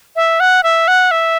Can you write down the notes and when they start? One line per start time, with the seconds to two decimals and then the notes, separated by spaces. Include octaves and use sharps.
0.16 E5
0.40 F#5
0.63 E5
0.88 F#5
1.11 E5